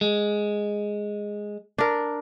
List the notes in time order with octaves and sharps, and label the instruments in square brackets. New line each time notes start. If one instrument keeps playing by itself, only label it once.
[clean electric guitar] G#3
[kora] D4 A#4